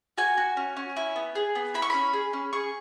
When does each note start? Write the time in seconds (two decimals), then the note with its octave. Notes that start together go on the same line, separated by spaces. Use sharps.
0.18 F#4 G#5
0.37 F#4
0.57 C#4
0.77 C#4
0.97 E4
1.16 B3
1.35 G#4
1.55 B3
1.74 E4 B5
1.82 C#6
1.90 C#4 B5
2.13 G#4
2.33 C#4
2.53 G#4 C#6